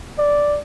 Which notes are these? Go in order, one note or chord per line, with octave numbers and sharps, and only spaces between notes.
D5